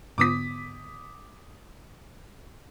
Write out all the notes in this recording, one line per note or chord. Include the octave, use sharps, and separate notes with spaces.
G#2 D3 B3 D6 D#6 B6